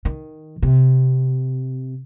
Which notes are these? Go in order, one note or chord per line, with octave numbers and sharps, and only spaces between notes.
D#3
C3